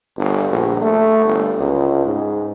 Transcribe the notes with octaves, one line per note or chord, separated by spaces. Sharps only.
G1
A#1
A3
G1
C#2
G#2